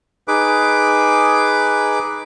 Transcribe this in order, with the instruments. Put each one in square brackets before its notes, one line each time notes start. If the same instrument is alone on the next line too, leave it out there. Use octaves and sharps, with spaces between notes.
[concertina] D#4 G#4 B4 D6